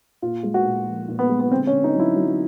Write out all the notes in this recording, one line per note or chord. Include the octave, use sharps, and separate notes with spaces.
A#2 F4
G#3
F#4
A#2
F3
A#2
B3
G#3
B3
D3 C4
C#4
D3
D#4
F#3
E4
F#3